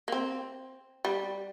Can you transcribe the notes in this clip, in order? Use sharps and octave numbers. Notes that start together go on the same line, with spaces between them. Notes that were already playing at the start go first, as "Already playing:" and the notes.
A#3
C4
G3